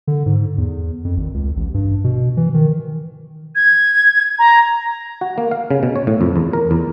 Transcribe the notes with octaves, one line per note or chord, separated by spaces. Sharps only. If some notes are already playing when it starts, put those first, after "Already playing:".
D3
G#2
E2
F2
G#1
C#2
A1
G2
B2
E3
D#3
G#6
A#5
F#4
A#3
F5
C#3
B2
C#5
A2
F2
E2
A#4
E2